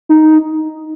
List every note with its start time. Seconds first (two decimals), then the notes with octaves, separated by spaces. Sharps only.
0.09 D#4